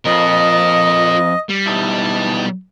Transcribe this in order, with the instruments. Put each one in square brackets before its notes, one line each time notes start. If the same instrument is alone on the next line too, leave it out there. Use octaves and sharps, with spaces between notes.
[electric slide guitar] F2 [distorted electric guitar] F4 A#4 [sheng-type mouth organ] D#5
[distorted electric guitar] G3
[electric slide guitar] B2 D#4 E4 [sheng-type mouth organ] A5